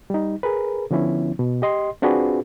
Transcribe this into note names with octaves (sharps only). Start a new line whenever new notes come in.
G3 D#4
G#4 A#4 B4
D3 F3 B3 C#4 E4
B2
G4 D#5 C6
C4 D4 F4 F#4 G#4 B4